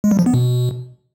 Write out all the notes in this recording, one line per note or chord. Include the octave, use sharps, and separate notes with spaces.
G#3
G3
F3
B3
B2